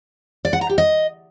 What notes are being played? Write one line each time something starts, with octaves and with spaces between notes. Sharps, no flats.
D5
F#5
A#5
G4
D#5